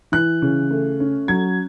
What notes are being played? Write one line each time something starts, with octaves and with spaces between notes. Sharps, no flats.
E3 F#6
C#3
A3
C#4
F#3 G#6